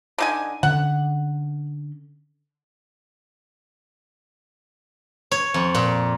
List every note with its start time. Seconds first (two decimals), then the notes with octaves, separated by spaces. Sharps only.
0.18 D3 D#4 G#5
0.63 D3 C#4 F#5
5.31 C#5
5.54 F2
5.75 A#2